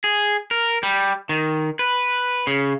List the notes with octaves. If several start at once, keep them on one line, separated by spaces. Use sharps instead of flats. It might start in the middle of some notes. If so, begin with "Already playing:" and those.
G#4
A#4
G3
D#3
B4
C#3